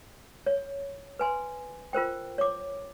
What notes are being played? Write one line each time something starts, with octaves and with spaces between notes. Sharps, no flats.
C#5
B4 G#5 C6
F4 A#4 C5 G5
C#5 D6